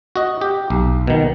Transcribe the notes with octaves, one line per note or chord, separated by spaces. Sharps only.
F#4 D#5
G4
B1
B2 D#3